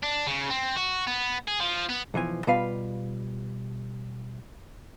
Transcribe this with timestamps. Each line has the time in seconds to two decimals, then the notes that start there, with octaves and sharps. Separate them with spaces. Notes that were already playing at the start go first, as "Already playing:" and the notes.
0.03 D4
0.27 C#3
0.51 C4
0.76 F#4
1.07 B3
1.48 G#4
1.60 F3
1.89 B3
2.14 B1 E3 F3 G#5
2.47 B2 G3 F4 B4 F5